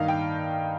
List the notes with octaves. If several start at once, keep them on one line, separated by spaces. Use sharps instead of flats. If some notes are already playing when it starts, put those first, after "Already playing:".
Already playing: G2 D#3 A#3 D#4 F5
G5